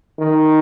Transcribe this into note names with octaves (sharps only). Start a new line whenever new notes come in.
D#3